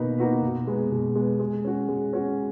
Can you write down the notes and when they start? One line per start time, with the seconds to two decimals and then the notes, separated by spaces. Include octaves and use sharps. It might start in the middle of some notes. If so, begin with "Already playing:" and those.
Already playing: B2 A#3 D#4 F#4 B4
0.18 A#3 D#4 F#4 B4
0.42 B2
0.67 G#3 B3
0.91 B2
1.16 G#3 B3
1.40 G#3
1.65 C#4 F#4
1.89 G#3
2.13 C#4 F#4